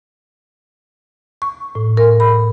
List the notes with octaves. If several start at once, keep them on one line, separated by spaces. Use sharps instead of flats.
C#6
A2
A#4
B5